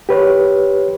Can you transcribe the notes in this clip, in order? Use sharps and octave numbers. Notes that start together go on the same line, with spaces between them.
G4 B4 C#5